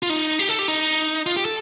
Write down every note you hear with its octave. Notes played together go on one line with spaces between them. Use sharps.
F4
D#4
G4
A4
G4
D#4
F4
G4
A4